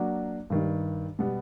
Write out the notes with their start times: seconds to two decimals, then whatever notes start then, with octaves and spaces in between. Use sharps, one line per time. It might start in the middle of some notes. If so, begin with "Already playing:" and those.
Already playing: F#3 A#3 D4 F#4
0.50 G2 D#3 G3
1.19 B2 G3 B3